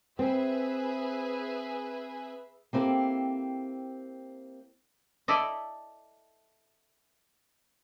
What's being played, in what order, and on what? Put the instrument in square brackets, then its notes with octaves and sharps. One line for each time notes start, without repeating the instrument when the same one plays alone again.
[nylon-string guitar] C4 [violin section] G#4 B4 E5
[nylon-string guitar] A#3 C4 E4 G4 A4
[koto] E4 A4 D5 D#5